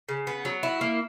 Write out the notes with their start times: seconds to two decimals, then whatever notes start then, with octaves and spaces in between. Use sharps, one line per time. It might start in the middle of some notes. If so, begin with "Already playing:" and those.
0.09 C#3
0.27 B3
0.45 F#3
0.63 E4
0.81 A#3